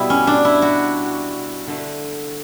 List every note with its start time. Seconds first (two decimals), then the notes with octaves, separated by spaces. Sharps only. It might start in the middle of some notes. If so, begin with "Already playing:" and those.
Already playing: B2 G3 B3 E4
0.10 C#4
0.27 D4
0.45 E4
0.62 F#4
1.67 D3 A3